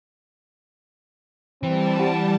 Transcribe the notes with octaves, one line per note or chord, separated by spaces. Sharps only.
E3 G3 C4 A5
E4 G4 F#5